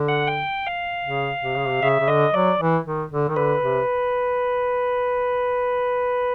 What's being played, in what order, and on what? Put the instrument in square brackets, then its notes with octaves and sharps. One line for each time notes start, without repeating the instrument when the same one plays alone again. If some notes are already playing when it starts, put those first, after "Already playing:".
Already playing: [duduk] D3
[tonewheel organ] F#5
G5
F5
[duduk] C#3
C3
C#3
C3
[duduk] C#3 [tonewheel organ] E5
[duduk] C#3
[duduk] D3 [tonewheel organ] D#5
[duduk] F#3 [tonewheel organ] D5
[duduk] E3
D#3
D3
D#3
[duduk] D3 [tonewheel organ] B4
[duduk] C3